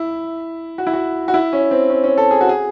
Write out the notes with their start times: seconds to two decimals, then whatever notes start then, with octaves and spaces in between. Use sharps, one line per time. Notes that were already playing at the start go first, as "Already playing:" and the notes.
Already playing: E4
0.78 F#4
0.87 E4
0.93 F#4
1.28 F#4
1.34 E4
1.53 C#4
1.71 C4
1.90 C#4
2.04 C#4
2.18 A4
2.31 G#4
2.41 F#4
2.49 G#4